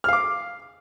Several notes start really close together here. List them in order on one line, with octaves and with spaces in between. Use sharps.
F6 F5 D6